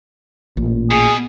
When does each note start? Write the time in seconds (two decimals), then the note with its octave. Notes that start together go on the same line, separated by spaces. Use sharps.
0.57 A1 A#2
0.91 B2 G#4